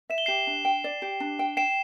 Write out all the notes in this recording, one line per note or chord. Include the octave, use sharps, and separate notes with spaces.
E5 E7
G7
G4 C7 E7
D4
G5
D5
G4
D4
G5
G5 C7 E7